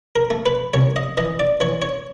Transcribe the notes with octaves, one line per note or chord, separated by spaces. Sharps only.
A#4
A3
B4
C2 C#5
D#5
E3 D#5
D5
E3 C#5
C#5